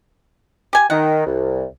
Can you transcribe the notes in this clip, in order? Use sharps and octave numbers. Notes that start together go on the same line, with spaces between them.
G4 G#5
D#3 F#5
C2